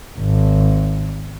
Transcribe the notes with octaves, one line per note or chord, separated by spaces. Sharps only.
G#1